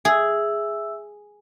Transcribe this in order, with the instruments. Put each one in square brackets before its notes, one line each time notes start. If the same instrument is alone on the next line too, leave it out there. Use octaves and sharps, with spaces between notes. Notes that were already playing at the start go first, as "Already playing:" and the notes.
[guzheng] G#4 [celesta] E5 E6